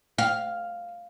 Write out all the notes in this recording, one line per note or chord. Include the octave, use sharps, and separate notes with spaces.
F5